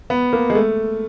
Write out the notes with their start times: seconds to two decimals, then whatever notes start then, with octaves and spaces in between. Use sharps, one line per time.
0.10 B3
0.33 A#3
0.50 G#3
0.55 A3